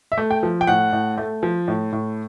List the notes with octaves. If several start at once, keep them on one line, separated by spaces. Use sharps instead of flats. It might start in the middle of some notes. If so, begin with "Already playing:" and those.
E5
A3
G5
F3
G5
A2 F#5
A2
A3
F3
A2
A2